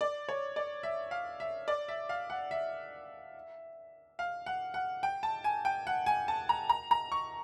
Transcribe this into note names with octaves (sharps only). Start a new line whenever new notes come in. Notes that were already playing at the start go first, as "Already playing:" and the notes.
D5
C#5
D5
E5
F5
E5
D5
E5
F5
F#5
E5
F5
F#5
F#5
G5
A5
G#5
G5
F#5
G#5
A5
A#5
A#5
A#5
C#6